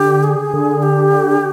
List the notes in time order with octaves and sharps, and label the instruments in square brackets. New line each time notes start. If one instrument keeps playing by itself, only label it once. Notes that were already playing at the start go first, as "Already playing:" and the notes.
Already playing: [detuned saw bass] D3 [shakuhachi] G4
[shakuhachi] G#4
[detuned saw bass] D3
[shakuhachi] G4